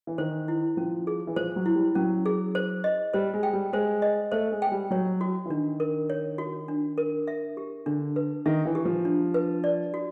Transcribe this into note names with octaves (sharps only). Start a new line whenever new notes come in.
E3
D#3 C5
E4
F3 C#4
G#4
E3
F3 C5
F#3
E4
G3
F#3 C#4
G#4
C5
D#5
G3 C5
G#3
G5
G3
G#3 C5
D#5
A3 C5
G#3
G#3 G5
G3
F#3 C#5
F#4
E3
D#3 D4
A#4
C#5
F#4
D4
A#4
E5
G4
D3 D4
B4
D#3 E5
E3
G4
F3
D4
B4
D5
F#4